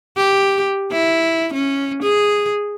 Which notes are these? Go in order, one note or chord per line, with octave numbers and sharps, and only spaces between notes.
G4
E4
C#4
G#4